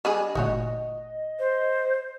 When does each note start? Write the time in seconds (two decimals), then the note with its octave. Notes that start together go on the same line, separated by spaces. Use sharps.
0.05 G3 D4 G#4 D#5 G#5
0.35 G1 A#2 A3 D#4 F#4 C#5
1.39 C5